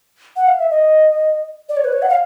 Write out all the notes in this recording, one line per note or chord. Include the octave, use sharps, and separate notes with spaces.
F#5
F5
E5
D#5
D5
C#5
B4
C#5
F#5
F5